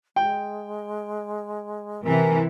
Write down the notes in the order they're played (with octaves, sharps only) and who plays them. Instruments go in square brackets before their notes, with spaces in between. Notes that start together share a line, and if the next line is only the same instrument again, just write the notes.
[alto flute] G#3 [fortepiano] G5
[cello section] C3 E3 [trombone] A#4 [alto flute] G#5